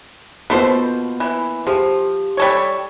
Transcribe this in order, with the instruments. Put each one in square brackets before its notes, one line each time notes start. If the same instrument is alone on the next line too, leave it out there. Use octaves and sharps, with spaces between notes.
[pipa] B2 A4 C5 [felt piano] A#3 B3 F4
[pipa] E3
[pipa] F3 [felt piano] G4
[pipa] G3 A4 C#5